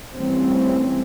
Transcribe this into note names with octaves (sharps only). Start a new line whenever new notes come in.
E3 G3 A3 C4 C#4